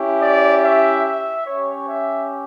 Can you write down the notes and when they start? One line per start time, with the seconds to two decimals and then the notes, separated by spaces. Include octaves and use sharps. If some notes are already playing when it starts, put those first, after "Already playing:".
Already playing: C#4 E4 G4
0.21 D5
0.63 E5
1.05 E5
1.47 C#4 G4 C#5
1.88 E5